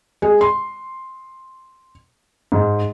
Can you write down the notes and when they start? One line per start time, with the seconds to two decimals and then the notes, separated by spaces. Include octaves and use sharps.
0.22 G#3
0.41 C6
2.52 G#2